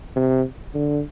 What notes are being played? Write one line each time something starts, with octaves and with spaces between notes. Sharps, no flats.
C3
D3